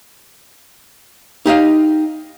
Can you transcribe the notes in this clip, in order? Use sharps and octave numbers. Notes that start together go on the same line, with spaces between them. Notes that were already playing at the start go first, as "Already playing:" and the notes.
D#4 G4 D#5 F5